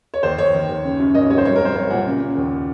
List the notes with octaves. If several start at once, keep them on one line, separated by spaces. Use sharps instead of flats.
C#5
D#2 C5
D#2 C#5
D#3
D#2
C#3
F#2
G#1 D#5
F#3 C#5
C5
C2 C#5
A#4
C2 C5
C2 C#5
A#2 F#5
C#3
C#3
D#2